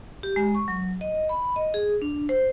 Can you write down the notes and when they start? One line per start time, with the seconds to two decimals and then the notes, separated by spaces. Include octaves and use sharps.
0.23 G4
0.36 G#3
0.55 C#6
0.68 F#3
1.01 D#5
1.29 B5
1.56 D#5
1.74 G#4
2.02 D4
2.29 C5